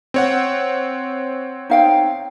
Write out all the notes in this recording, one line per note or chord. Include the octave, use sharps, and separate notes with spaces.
C4 C#5 F#5
D#4 F5 G5